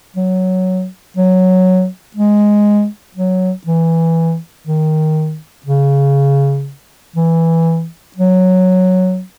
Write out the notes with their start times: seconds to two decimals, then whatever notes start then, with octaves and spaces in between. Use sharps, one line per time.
0.16 F#3
1.17 F#3
2.16 G#3
3.16 F#3
3.67 E3
4.67 D#3
5.66 C#3
7.16 E3
8.16 F#3